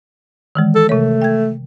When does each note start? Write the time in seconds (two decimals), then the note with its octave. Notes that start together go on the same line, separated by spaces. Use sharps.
0.55 D#3 E3 G#3
0.75 A4
0.89 C3 A3 C#5
1.22 G5 G#6